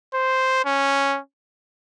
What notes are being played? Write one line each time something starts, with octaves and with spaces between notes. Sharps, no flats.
C5
C#4